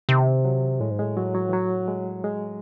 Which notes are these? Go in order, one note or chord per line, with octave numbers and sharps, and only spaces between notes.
C3 D#3
F#3
A2 G#3
G#2
A2 G#3
F#3
F#3
E3
F#3
G#3
G#3